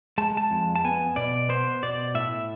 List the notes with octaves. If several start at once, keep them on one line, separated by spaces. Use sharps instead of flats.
G#3 A5
A5
F2
A5
B3 G#5
B2 D5
B3 C5
B2 D5
A2 E5